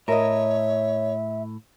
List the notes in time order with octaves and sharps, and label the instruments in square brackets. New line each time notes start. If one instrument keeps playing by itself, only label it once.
[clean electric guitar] A2 [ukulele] A#4 D#5 [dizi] C#5 [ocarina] E5